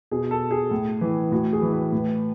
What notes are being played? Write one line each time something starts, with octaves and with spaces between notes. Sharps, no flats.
B2 G#4
A4
G#4
A2
E3
A2 F#4
G#4
E3
B4
A2